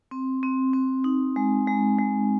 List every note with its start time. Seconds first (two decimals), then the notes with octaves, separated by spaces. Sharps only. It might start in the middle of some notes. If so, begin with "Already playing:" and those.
0.11 C4
0.43 C4
0.73 C4
1.04 D#4
1.36 G#3
1.67 G#3
1.99 G#3